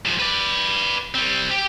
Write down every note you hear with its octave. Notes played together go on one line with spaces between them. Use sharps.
G#2 F3
B4 D5
G3 C4
G4